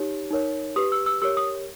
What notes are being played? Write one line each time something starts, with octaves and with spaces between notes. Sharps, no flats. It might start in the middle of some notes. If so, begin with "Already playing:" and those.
Already playing: D#4 G4 C#5
D#4 A#4 C#5
G4 B4 D#6
E6
E6
G4 A#4 C#5 E6
D#6